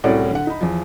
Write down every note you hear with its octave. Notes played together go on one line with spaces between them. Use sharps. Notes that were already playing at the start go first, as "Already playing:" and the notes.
C2 A2 C#4 F#4 D5
D3 F#5
D#4 B5
E2 F3